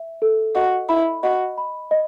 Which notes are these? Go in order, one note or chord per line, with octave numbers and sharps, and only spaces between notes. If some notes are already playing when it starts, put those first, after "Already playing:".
Already playing: E5
A4
F#4 D#5
E4 B5
F#4 D#5
B5
D#5